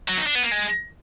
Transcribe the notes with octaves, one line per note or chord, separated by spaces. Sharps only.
F#3
D#4
D4
B3
A#3
G#3